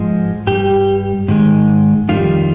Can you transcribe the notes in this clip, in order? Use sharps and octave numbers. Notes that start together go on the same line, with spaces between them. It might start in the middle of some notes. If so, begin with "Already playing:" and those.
Already playing: G#2 F3 G#3
G2 G3 G4
G#2 D#3 G#3
F2 D#3 G3 F4